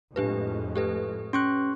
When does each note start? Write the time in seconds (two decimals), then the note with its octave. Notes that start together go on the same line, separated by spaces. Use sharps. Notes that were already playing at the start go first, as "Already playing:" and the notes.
0.16 F2 A2 G#3 D4 G4 B4
0.76 G4 A4 B4
1.33 C#4 C6 C#6 F#6